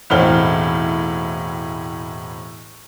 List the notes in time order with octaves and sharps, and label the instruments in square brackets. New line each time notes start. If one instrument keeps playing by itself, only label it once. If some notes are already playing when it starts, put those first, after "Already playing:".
[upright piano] E1 A2 C4 D#4 F6 G7